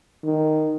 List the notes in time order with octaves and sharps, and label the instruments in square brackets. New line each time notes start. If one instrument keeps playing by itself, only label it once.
[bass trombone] D#3